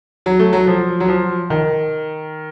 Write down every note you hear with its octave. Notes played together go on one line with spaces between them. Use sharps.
F#3
A3
F#3
F3
F#3
F3
D#3